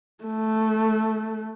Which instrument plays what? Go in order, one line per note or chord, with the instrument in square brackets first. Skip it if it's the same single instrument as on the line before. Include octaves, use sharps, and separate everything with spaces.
[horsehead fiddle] A3